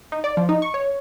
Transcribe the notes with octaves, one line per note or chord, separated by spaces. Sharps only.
D#4
D5
F3
D#4
C#6
C#5